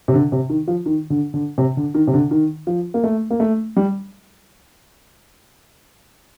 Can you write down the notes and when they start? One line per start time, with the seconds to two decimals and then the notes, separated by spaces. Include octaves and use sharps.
0.08 C3
0.14 D3
0.32 C3
0.50 D#3
0.68 F3
0.86 D#3
1.10 D3
1.34 D3
1.58 C3
1.77 D3
1.95 D#3
2.07 C3
2.13 D3
2.31 D#3
2.67 F3
2.94 A#3
3.04 A3
3.30 A#3
3.40 A3
3.77 G3